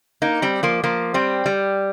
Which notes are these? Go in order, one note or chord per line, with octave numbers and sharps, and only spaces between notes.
A#3 D#4
G3 C4
F3 A#3
F3 A#3
G3 C4
G3